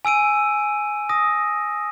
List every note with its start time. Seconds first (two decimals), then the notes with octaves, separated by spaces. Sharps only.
0.05 G#5 E6 D7 D#7
1.09 D#6 A#6